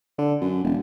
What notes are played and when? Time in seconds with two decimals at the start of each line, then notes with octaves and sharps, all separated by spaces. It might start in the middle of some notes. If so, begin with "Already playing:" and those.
0.18 D3
0.41 F#2
0.64 E1